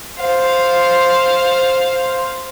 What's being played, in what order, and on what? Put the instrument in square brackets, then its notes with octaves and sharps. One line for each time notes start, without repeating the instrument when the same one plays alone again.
[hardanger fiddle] C5 F5